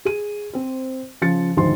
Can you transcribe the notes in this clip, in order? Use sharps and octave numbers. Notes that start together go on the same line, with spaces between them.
G#4 D#7
C4 C5
C#3 F3 A6 C#7
D2 G#2 D#3 F3 C5 C6